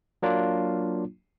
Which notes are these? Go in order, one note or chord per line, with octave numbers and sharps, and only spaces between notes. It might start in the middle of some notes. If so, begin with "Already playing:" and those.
F#3 A#3 D4 F4